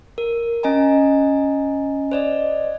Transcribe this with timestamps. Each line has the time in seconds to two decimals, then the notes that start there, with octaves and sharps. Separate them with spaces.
0.18 A#4
0.63 C#4 D#5 G#5 A#5
2.12 C5 D5 D#5